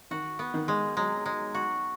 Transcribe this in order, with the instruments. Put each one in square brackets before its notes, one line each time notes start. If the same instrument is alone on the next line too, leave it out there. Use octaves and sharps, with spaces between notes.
[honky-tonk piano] D#3 [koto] F#4
[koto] B3
[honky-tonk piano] D#3
[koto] G#3
[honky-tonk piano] F#3 [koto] G#3
[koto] G#3
F#4